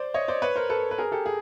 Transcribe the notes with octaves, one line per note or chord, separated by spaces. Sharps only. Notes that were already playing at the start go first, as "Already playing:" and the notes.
Already playing: C5 D5
C#5 D#5
C5 D5
B4 C#5
A#4 C5
A4 B4
B4
G#4 A#4
G4 A4
G#4